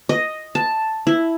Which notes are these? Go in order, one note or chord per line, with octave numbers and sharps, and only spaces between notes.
D#5
A5
E4